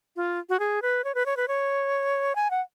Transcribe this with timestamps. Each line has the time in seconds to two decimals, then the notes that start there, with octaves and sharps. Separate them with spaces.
0.16 F4
0.49 F#4
0.60 G#4
0.82 B4
1.04 C#5
1.15 B4
1.26 C#5
1.37 B4
1.48 C#5
2.36 G#5
2.51 F#5